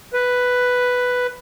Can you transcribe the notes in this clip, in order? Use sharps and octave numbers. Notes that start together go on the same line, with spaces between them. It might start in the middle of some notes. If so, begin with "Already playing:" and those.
B4